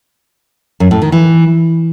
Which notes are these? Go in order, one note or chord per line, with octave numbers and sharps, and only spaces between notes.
F#2
A2
D#3
E3